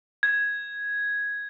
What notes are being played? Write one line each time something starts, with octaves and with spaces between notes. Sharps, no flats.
G#6